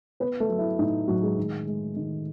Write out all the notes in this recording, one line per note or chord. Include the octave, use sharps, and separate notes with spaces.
B3 B4
A3 A4
F#3
E4
A2 D#4
A2 F#3 F#4
G#3 G#4
D#3
G#3
D#3